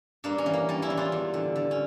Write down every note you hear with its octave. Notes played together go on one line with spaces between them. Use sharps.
G2 A#3 D4
C#4
E3
A#3
G3 C#4
C#4 E4
E3
D4 F4
E2
D3
D3
C#4